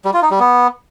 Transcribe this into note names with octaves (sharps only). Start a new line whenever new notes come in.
G3
F4
D#4
G3
B3